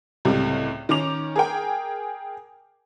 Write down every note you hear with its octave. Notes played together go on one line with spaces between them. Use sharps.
C#2 A2 C3 G3
D#3 C#4 D6 F7
G#4 A#4 G5